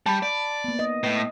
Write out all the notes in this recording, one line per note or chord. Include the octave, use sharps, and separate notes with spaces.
G3 A5 B5
D5
A#3 B3
D#5
A2 B4